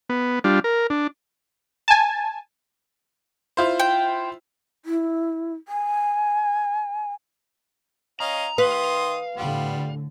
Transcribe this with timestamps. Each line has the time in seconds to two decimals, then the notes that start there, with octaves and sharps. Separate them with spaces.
0.09 B3
0.44 G3 D4 F4
0.64 A#4
0.90 D4
1.88 G#5 A5
3.57 E4 F4 C5
3.79 G5
4.85 E4
5.68 G#5
8.20 C#4 D#5 F5 A#5
8.58 D#3 B4 F5 C6 D#6
9.35 A2 D3 G3 B3 F4